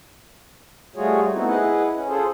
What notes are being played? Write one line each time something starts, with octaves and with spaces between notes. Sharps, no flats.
G3 A3 F4 F#4 G#4 C#5
A3 B3 C4 D#4 E4 F#4
E4 G#4 B4 D#5 F#5
C#4
F4 G#4 A4 C5